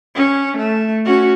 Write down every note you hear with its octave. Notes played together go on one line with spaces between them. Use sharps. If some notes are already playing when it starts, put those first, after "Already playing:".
C#4
A3
C#4 F#4